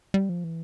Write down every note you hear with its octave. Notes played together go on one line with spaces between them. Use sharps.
G3
F3
E3